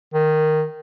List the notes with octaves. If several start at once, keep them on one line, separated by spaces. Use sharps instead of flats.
D#3